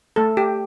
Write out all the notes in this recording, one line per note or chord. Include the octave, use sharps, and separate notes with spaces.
A3 A4
G4